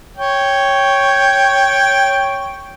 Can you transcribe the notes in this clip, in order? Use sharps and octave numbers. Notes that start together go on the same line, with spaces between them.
C#5 G5